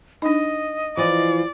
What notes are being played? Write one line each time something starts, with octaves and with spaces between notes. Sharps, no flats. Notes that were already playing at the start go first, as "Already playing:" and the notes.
D4 D#4 D#5
E3 F3 D5